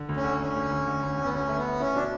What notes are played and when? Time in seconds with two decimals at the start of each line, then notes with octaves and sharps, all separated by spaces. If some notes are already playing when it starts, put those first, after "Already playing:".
Already playing: D3
0.09 D2
0.16 C#4
0.24 D3
0.40 D2 C#4
0.56 D2
0.71 D2
0.87 D2
1.03 D2
1.17 D2
1.25 B3
1.33 D2 C#4
1.49 A3
1.57 B3
1.65 A3
1.80 C#4 E4
1.95 B2 D4